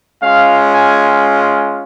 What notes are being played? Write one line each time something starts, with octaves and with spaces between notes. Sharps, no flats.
G#3 C#4 F4 F5
G#5